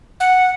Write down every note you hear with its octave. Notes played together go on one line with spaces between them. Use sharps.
F#5